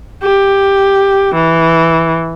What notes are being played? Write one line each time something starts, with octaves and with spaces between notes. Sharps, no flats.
G4
E3